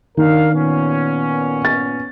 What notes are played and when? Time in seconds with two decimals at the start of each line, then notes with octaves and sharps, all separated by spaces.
0.17 D#3 D4 A#4 F5
0.53 A#2 B3 C#4
1.65 A6